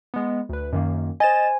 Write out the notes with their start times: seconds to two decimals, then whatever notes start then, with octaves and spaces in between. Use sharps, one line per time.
0.14 G#3 B3
0.49 D2 B4
0.73 F#2 D#3 A#3
1.20 C5 D#5 G#5 A6 E7